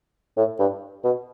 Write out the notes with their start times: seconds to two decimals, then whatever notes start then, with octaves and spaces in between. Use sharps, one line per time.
0.37 A2
0.59 G2
1.04 B2